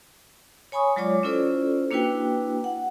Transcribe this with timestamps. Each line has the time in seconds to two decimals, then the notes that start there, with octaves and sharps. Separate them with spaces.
0.72 C#5 G#5 B5 C#6 D#6
0.96 F#3 G#3 F4 C#5 D5 D6
1.23 C#4 E4 F4 A4 C5 D5
1.91 A#3 D4 E4 F#4 B4 G5
2.64 F#5